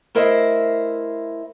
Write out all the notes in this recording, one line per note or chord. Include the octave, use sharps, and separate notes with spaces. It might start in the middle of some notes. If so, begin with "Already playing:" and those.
A3 E4 A#4 C5 D#5 E5